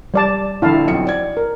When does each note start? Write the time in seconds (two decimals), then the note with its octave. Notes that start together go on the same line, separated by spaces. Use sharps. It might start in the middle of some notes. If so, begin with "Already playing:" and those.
0.14 G3 D5 A5
0.62 A#1 D3 E4 F5 A5
0.87 B1 F2 C#7
1.07 D5 G#6
1.37 A#4